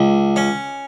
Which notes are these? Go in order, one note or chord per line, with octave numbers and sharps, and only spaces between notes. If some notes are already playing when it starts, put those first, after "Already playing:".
Already playing: C#2
C#4